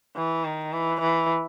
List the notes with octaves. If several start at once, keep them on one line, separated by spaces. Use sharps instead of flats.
E3
D#3
E3
E3